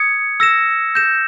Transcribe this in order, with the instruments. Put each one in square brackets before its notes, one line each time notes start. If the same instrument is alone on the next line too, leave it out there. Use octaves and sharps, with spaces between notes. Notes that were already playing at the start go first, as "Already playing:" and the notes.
Already playing: [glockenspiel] D#6 G#6 C#7
E6 A#6 E7
G6 A#6 E7